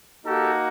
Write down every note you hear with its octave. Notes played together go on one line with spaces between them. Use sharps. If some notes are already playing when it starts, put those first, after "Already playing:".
A#3 D#4 F#4 G4 A4